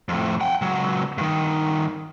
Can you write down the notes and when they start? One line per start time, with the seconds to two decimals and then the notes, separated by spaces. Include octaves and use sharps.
0.09 F2 A2
0.41 F#5 G5
0.62 C#2 F#3
1.18 G2 D#3